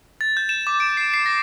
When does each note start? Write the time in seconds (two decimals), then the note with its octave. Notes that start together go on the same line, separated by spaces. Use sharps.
0.21 A6
0.37 G6
0.49 E7
0.67 D6
0.80 D7
0.97 C7
1.14 C7
1.26 A#6